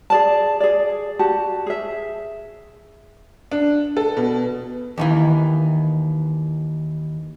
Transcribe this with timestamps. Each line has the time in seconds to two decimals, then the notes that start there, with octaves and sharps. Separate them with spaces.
0.10 G#4 D5 A5
0.60 G#4 D5
1.19 F#4 G4 A5
1.66 G#4 E5
3.52 D4
3.97 A4
4.17 B2
4.98 D#2 D#3 E3